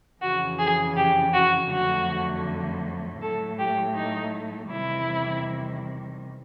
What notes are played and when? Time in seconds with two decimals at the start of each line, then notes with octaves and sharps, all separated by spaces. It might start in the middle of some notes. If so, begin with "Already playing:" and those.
0.21 F2 C#3 E3 F#4
0.59 G#4
0.96 G4
1.33 F#4
1.71 F2 D3 F#3 A3 F#4
3.21 A2 F#3 A3 A4
3.59 G4
3.95 D#4
4.71 E2 C3 D#3 G3 E4